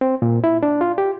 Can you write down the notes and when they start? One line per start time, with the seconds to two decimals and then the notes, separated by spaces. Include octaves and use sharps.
0.01 C4
0.22 A#2
0.44 E4
0.63 D4
0.81 F4
0.98 G4